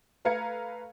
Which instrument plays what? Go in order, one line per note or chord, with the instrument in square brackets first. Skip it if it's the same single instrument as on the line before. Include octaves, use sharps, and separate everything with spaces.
[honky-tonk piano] A3 B4 F5 A#5 G#6 C#7